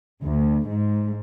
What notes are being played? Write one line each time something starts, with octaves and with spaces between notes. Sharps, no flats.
D2
G#2